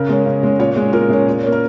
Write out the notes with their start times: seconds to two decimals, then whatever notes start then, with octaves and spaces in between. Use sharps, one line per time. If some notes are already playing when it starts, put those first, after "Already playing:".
Already playing: C#3 A#4
0.09 G#3 C#4
0.26 C#3
0.43 G#3 C#4
0.59 A#2 C#5
0.76 G#3 C#4
0.93 A#2 A#4
1.09 G#3 C#4
1.26 A#2
1.43 A#3 C#4
1.52 A#4